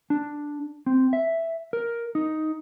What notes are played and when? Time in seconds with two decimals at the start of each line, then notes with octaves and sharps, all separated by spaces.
0.10 D4
0.86 C4
1.13 E5
1.73 A#4
2.15 D#4